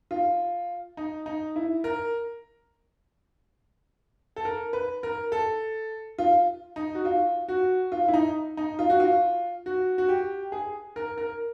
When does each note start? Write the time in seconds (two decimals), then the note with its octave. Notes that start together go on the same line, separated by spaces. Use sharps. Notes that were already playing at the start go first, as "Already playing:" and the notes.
0.11 F4
0.97 D#4
1.26 D#4
1.56 E4
1.84 A#4
4.36 A4
4.45 A#4
4.73 B4
5.03 A#4
5.32 A4
6.18 F4
6.76 D#4
6.95 F#4
7.05 F4
7.48 F#4
7.92 F4
8.08 E4
8.14 D#4
8.57 D#4
8.79 F4
8.90 F#4
9.00 F4
9.66 F#4
9.98 F#4
10.09 G4
10.52 G#4
10.96 A#4
11.18 A#4